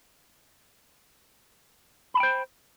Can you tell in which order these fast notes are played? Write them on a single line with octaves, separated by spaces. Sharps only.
B5 A5 G5 C5